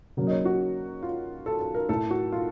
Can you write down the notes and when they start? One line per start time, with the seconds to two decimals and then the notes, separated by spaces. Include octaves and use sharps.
0.17 C#3 F#3 A#3
0.27 D#5
0.31 C#5
0.45 F#4
1.03 F4
1.46 A4
1.61 A4
1.74 A#4
1.89 A2 A3 A4
2.11 F#4
2.32 F4